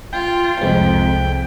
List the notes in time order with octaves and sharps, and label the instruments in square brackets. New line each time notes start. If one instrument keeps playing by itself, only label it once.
[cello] F4 [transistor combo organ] G5
[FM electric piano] C2 G#3 C4 [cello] F2